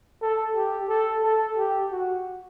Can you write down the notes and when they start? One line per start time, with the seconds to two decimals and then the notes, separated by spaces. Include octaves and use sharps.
0.22 A4
0.55 G4
0.89 A4
1.23 A4
1.56 G4
1.91 F#4